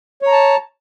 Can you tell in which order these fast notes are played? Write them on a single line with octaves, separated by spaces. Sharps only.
C#5 A#5 A5